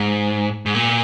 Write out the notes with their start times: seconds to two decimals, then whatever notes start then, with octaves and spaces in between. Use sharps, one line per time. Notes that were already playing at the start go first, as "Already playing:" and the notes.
Already playing: G#2
0.66 G#2
0.75 A#2